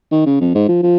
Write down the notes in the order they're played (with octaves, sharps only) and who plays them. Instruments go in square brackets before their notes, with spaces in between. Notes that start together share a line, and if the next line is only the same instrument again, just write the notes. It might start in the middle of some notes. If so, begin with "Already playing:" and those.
[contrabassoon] D#3
C#3
F2
G#2
F3
F3